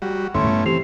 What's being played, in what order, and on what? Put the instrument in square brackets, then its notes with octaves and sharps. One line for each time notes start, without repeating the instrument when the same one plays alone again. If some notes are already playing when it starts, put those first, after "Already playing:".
[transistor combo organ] G3 F#4
[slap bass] G1 F2 [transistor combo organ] A3 C#4 E4 [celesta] C6
[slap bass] G2 G3 B3
[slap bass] E3 [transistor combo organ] C4 [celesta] G4 C7 F7